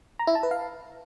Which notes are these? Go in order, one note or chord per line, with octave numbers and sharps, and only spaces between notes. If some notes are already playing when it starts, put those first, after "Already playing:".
A#5
E4
A5
B4
F5